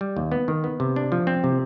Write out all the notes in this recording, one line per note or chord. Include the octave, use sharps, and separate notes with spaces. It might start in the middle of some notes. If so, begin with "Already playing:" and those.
G3
D#2
B3
D#3
B3
C3
D4
F3
C4
C3